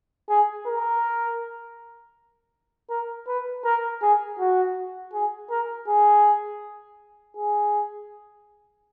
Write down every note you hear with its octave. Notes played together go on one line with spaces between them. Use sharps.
G#4
A#4
A#4
B4
A#4
G#4
F#4
G#4
A#4
G#4
G#4